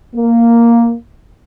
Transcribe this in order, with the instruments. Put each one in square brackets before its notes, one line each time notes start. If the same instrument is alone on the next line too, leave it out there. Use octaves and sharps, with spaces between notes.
[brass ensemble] A#3